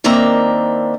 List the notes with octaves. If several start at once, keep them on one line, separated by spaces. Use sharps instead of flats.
D#3 A#3 C4 D4 E5 A#5